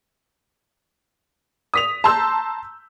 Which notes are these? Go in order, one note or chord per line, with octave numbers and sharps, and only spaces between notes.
D#6 B6 F7
A5 A#5 C6 E6 G6